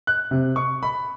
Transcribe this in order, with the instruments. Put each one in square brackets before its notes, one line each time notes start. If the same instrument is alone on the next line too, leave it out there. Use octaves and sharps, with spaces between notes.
[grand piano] F#6
C3
C#6
B5